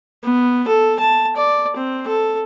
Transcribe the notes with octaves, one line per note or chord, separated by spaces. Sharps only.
B3
A4
A5
D5
C4
A4